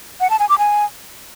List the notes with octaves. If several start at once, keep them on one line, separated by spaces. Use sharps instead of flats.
F#5
A5
G#5
D6
G#5